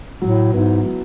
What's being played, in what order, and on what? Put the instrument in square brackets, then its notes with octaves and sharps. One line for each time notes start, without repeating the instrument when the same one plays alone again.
[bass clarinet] A2 [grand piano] F#3
[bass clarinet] G#2 [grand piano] B3 E4
[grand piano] F#3